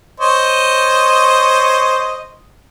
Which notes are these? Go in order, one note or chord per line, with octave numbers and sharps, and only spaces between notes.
C5 C#5 D#5